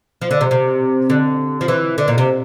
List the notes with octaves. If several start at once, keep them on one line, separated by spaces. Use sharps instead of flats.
F3
D3
C3
C3
D3
F3
E3
D3
A#2
C3